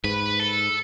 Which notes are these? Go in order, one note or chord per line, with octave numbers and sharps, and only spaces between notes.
G#2 B4
A4